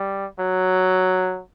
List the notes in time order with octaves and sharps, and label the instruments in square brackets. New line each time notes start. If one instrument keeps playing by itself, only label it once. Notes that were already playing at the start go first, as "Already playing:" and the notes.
Already playing: [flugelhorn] G3
F#3